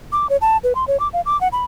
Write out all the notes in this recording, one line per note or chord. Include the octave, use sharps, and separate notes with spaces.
D6
C#5
A5
B4
C6
C#5
D6
F5
D6
F#5
B5